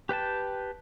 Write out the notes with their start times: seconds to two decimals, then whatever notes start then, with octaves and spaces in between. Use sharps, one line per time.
0.09 G4 B4 G5 A5